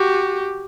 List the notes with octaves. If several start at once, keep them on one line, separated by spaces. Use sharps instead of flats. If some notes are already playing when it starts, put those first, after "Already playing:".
Already playing: F#4 G4